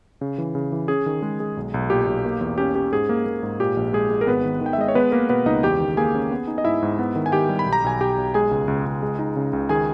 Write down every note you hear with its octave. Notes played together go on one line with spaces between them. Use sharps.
C#3
E3
C#3
E3
C#4 G#4
D#3
G#3
G#3
B1
B1
A#2 G4
B1
A#3
E2
C#4 G4
C#4 G4
G#2 G#4
A#3
A#3
G#2
A#2 G4
A#1
G#3 G#4
G#3
A#4
G#1 B3 B4
D#3
D#3 G5
E5
G#3 D#5
C#5
G#3 B3 B4
G#3 A#3 A#4
B2 B3 B4
C#2 D#4 D#5
E2 G4 G5
D#3
A#3 G#4 G#5
C#4
B3
D#4
D#5
G#2 E4 E5
G#2
B3
D#3
G#5
D#3 G4 G5
G3
B5
B1
A#5
B1 G#5
B1 G4 G5
B1
G#3 G#4 G#5
C#2
C#2
C#2
G#3
D#4
C#3
C#2
D#3 G#4 G#5